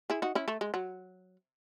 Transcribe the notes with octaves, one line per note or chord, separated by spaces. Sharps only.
E4 G#4
D#4 F#4
C#4 E4
A3
G#3
F#3